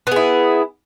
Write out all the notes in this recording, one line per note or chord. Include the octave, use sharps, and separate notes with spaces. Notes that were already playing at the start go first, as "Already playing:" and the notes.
B3 E4 G#4